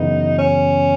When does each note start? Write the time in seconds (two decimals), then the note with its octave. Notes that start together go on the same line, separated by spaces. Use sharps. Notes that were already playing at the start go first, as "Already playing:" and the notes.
Already playing: F#2 C#3 E3 B3 D#4
0.38 C#4